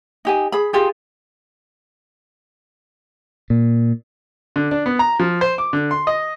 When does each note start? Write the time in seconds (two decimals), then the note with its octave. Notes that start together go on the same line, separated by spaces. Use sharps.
0.25 D#4 G4 G#5
0.52 G#4 B5
0.73 F4 G4 G#4
3.50 A#2
4.56 D3
4.71 D4
4.86 B3
4.99 A#5
5.20 F3
5.41 C5
5.58 D6
5.73 D3
5.91 C6
6.07 D#5